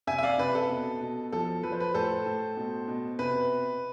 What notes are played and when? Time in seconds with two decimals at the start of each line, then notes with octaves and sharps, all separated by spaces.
0.07 C3 E5 G#5
0.19 E5
0.23 D5 F5
0.38 C3 B4
0.55 A4
0.69 B2
1.01 B2
1.32 F3 A4
1.63 F3 B4
1.72 C5
1.80 B4
1.94 A2 A4 C5
2.26 A2
2.57 B2
2.88 B2
3.19 C3 B4